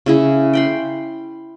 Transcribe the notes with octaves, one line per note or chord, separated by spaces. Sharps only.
C#3 E4 G#4
G5 B5 C6